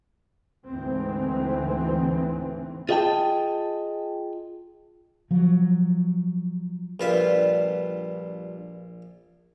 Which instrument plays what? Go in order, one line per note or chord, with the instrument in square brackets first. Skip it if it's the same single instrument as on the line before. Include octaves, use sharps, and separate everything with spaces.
[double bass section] D2 G#2 E3 C4
[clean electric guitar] F4 G#4 D#5 F#5 G5 A5
[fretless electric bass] F3 F#3
[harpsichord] A#1 F4 E5 [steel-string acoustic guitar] G3 D4 B4